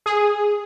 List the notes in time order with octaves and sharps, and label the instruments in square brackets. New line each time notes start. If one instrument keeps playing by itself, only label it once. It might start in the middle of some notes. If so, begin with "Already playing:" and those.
[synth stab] G#4